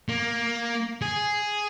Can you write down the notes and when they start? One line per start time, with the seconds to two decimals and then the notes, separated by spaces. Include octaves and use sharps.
0.09 A#3
1.02 G#4